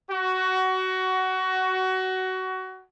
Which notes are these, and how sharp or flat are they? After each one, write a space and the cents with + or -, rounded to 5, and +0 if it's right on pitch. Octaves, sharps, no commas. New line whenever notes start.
F#4 +20